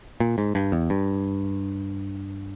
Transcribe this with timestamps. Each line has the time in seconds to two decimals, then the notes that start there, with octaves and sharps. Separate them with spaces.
0.20 A#2
0.38 G#2
0.55 G2
0.72 E2
0.90 G2